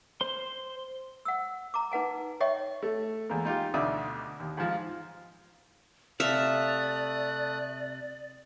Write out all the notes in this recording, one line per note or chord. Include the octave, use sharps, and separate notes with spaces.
C5 C6
F#5 E6
A#5 D6
D#4 B4 F#5 G#5
C#5 D#5 E5 G5 C#6
A3
E2 G#3 A#3
D#4 F4 G4
D2 B2 D3 D5 E5 D#6
D#2
G#2 F3
C3 A3 D5 E5 F5 D#6 F#6